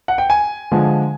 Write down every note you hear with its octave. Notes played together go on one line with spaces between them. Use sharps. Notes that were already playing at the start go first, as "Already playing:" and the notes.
F#5
G5
G#5
D3 F3 G#3